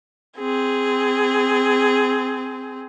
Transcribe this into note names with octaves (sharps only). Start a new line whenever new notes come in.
C4 G#4